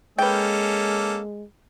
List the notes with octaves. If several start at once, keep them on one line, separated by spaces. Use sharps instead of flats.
G#3 A#3 C#4 A4 B4 G5